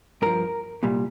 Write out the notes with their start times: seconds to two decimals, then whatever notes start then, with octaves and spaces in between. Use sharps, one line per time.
0.22 G2 F3 A#4
0.83 C2 A#2 G3